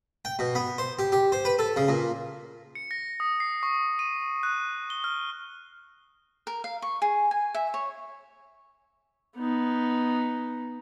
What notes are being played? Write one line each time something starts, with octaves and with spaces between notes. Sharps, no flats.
G5
B2
B3
C5
G4
G4
C5
B4
A4
C#3
A#2
C#7
A#6
D#6
C7
C#6
D#7
F#6
G7
F6
A#4
F5
C#6
G#4
G#5
E5
C#5
B3 D#4